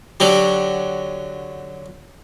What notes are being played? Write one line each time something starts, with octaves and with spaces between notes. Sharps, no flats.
D3 F#3 G4